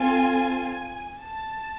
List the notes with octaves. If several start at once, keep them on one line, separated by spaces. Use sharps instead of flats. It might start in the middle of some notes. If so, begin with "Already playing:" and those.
Already playing: C4 F4 A4 G#5
A5